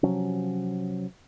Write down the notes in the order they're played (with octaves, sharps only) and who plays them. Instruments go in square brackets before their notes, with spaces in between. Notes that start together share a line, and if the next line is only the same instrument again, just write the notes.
[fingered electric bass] C3 F3 F#3 C#4